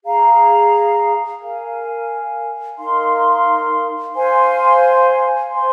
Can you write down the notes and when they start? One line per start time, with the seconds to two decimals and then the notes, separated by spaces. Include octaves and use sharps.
0.04 G#4 F5 A#5
1.41 A#4 F5 G#5
2.77 D#4 A#4 F5 C6
4.14 C5 F5 G#5 C6
5.51 C5 G#5 C6